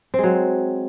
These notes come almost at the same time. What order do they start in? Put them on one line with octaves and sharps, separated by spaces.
C4 G#3 F#3